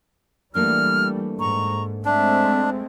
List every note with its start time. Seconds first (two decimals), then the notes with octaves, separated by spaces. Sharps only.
0.55 E3 G3 A3 A#3 D4 F6
1.39 G#2 A#5 C#6
2.05 G#3 A3 C4 D4 E5